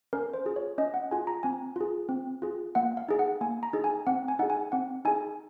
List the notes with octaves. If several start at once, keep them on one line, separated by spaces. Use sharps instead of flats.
C#4 A#4
C5
F4 G#4
C#5
C#4 D#5
F#5
F4 G#4 G#5
A#5
C4 G#5
F4 G#4
C4
F4 G#4
A#3 F#5
F5
D#4 G#4
F#5
A#3 G#5
A#5
D#4 G#4
G#5
C4 F#5
G#5
D#4 G#4 F#5
G#5
C4 F#5
D#4 G#4 G#5